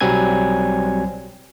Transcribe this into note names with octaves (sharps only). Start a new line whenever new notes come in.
B1 F#3 G3 C4 G#5 G#6